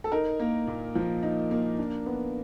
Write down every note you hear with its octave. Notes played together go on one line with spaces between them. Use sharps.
A4
D#4 A#4
A#3
A#2
F3
D#4
A#3
D4
B3